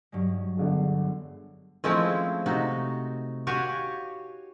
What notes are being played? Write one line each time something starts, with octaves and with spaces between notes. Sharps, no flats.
G2 F#3 G#3
G1 D3 G#4
F3 G#3 A3 C4 C#4 E4
C3 D#4 F#4
F#4 G4 C#5 F5 F#5 G#5